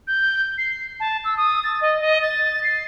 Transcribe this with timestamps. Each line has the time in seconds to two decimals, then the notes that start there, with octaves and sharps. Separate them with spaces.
0.07 G6
0.58 C7
1.00 A5
1.24 E6
1.37 D#6
1.64 A6
1.81 D#5
2.01 D#5
2.22 A6
2.64 C7